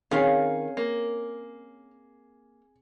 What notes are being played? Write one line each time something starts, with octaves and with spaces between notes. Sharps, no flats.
D#3 C4 C#4 G#4 A#4 C#5 F5
A#3